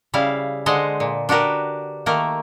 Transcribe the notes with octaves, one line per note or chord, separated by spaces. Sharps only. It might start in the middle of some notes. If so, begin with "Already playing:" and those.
C#3 G3 E4 F5
D3 G#3 C5 D#5 F#5
A#2
D4 F#4 G4 A#4 B4
D#3 A3 A#3 A#4